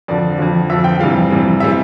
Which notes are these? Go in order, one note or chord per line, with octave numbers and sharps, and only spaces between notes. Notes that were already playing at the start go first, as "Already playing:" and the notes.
F2 D3 F3 D5
F2 D3 F3
F2 D3 F3 E5
G5
F2 C3 E3 G3 F5
F2 C3 E3 G3
C3 E3 G3 E5